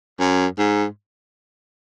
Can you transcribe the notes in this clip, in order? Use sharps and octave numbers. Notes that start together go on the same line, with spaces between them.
F#2
G#2